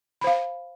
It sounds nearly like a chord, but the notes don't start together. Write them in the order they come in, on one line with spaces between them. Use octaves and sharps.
B5 C5 F5